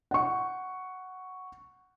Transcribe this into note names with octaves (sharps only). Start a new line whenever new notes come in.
F#5 C#6